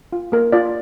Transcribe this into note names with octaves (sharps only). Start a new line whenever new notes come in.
F4
A#3 A#4
F4 D5